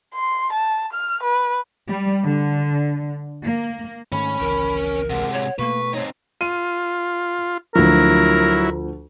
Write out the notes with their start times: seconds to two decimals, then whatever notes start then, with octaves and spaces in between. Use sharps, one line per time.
0.14 C6
0.53 A5
0.93 F6
1.23 B4
1.88 G3
2.23 D3
3.44 A#3
4.12 G#2 D#3 A3 C#4 B5
4.40 G#1 C#2 E3 A#4
5.10 C3 G#3 F#5
5.33 C#5
5.59 B2 A3 A#3 B4 C#6
5.93 C4 D#4 C#5
6.41 F4 D#7
7.75 D2 F3 F#3 E4 A#4